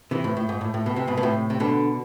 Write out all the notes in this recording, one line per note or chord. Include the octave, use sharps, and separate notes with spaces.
C3 E3
A2
A2
G#2
A2
A2
B2
C3
G#2 B2
B2
A2 C3
C3
B2 D3